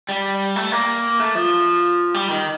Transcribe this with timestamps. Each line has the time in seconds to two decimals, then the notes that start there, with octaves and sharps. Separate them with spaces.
0.09 G3
0.56 A3
0.72 A#3
1.20 A3
1.35 F3
2.14 G3
2.30 D#3